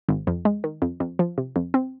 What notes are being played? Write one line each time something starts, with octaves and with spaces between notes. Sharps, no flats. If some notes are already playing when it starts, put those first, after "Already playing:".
G#1
F2
G#3
D#3
F2
F2
F3
C3
F2
C4